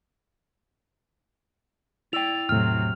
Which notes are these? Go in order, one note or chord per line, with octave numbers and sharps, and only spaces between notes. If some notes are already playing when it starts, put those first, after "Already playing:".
E4 D5 G5 F7
E2 A2 C3 F#3 F6